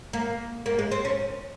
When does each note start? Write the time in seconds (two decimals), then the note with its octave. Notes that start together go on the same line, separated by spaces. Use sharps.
0.13 A#3
0.66 A#3
0.79 G#3
0.91 C4
1.05 C#4